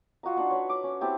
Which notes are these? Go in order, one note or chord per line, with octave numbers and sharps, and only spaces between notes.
F4 F#4 D#5 A#5
D4 D#4 F#5 C6
B4 C#5
D6
C#4
C4 E4 G4 A5